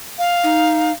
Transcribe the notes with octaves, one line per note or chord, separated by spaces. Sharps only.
F5
D#4